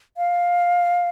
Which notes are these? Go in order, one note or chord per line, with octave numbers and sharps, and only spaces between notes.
F5